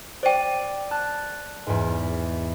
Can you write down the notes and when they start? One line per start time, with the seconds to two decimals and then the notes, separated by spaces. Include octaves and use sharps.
0.23 C5 D5 G5 D#7
0.91 A5 F#6
1.67 E2 G#2